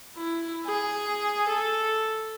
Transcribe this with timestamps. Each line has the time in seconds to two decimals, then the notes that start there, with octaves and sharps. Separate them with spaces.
0.16 E4
0.66 G#4
1.48 A4